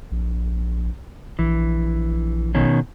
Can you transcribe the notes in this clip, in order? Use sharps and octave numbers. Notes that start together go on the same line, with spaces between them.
A#1
A#1 E3
B2 D#3 C#4